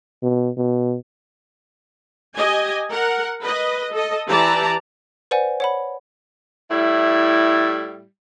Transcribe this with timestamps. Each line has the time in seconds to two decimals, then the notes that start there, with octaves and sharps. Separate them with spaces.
0.22 B2
0.57 B2
2.36 G4 D#5 G#5
2.91 A#4 F#5
3.41 B4 D#5
3.93 A4 D#5
4.27 E3 G4 D5 A5 A#5
5.31 B4 C5 D5 F#5 G#5
5.60 C#5 F#5 B5
6.71 A2 G3 E4